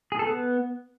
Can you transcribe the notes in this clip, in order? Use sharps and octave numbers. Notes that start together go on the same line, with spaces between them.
G#4
A4
B3